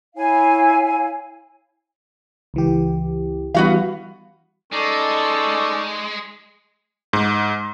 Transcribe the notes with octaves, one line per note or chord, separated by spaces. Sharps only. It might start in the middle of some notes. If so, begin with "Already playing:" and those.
E4 C#5 F5 G#5
C#2 E3 G4
E3 G3 B3 F#4 F5
G#3 C#4 D#4 A4 D5
G#2